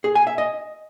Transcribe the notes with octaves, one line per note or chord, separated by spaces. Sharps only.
G#4
G#5
E5
D#5